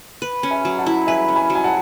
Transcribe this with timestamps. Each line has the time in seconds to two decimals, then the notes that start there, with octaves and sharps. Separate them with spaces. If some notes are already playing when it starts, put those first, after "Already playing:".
0.22 B4
0.43 C#4
0.51 E5 G#5
0.65 F#3
0.78 F#5 A5
0.86 E4
1.07 B4 E5 G#5
1.28 C#4
1.35 G#5 B5
1.50 F#3
1.55 G#5
1.64 F#5 A5